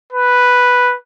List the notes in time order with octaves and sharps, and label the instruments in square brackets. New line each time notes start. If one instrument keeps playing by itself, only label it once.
[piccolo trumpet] B4